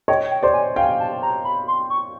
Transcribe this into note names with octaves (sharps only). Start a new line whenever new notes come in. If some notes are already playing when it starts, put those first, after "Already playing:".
C#5 D#5 G5
G5
C5 D5
G#5
F5 G5 G#5
A5
A#5
B5
C6
C#6